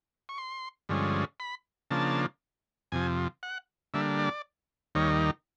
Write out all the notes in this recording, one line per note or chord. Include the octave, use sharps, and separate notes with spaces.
C#6
C6
G2 D3 F3 G#3 C#4
B5
C#3 F3 A#3 D4 A5
F2 C3 F3 G#5
F#5
D3 G3 A#3 D4 E5
D5
D#2 D#3 G3 A#3 D#4 C#5